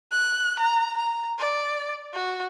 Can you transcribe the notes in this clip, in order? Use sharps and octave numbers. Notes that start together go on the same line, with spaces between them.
F#6
A#5
A#5
D5
F#4